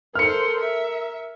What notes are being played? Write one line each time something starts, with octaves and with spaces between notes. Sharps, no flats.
A4 A#4 C5 F6 C#7
E5